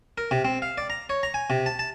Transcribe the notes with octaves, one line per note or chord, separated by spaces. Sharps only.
A#4
C3
C4
F5
D5
A#5
C#5
A#5
G#5
C3
A5
A5